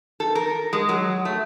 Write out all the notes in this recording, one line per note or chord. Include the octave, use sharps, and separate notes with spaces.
A4
A#4
G#3
F#3
A3